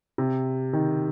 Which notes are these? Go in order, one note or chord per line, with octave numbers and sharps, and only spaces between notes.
C3
D#3